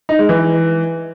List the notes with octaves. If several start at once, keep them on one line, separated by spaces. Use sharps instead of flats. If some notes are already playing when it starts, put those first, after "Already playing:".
D#4
G#3
E3